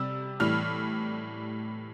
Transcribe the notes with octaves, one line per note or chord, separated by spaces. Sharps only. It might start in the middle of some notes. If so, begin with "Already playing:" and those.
Already playing: C3 G3 E6
A2 E3 G3 F6